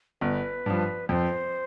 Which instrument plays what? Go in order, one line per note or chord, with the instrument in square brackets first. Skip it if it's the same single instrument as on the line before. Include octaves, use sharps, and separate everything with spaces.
[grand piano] G1 [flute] B4
[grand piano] G2 F3
[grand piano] F2 [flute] C5